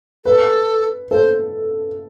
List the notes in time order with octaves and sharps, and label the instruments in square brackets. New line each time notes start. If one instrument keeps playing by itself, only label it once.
[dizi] A4 [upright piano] B4
[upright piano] A4 [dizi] C5